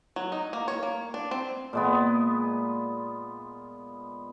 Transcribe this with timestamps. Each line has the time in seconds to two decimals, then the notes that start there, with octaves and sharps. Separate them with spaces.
0.16 F#3
0.32 D#4
0.53 A#3
0.68 C#5
0.83 A#3
1.14 D4
1.31 C4
1.73 A#2 G#3 B3